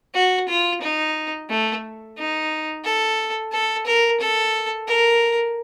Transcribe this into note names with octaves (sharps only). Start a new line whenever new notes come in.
F#4
F4
D#4
A3
D#4
A4
A4
A#4
A4
A#4